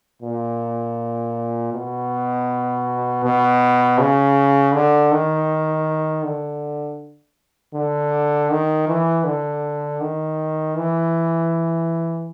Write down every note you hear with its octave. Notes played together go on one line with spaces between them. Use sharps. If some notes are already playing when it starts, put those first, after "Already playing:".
A#2
B2
B2
C#3
D3
D#3
D3
D3
D#3
E3
D3
D#3
E3